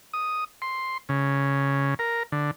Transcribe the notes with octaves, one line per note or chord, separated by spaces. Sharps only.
D#6
C6
C#3
A#4
D3